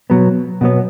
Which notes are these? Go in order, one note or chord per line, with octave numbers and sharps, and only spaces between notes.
B2 F#3 B3
B2 F#3 B3